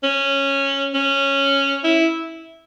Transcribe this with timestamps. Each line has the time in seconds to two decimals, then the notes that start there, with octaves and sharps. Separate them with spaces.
0.04 C#4
0.94 C#4
1.84 E4